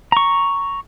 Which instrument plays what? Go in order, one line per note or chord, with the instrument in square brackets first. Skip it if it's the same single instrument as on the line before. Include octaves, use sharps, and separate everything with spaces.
[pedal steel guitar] A#5 C#6